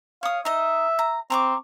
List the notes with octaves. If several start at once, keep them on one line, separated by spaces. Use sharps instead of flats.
C#5 F5 D#6
D#4 D#5 E5
A#5
C4 A#5 C#6 D6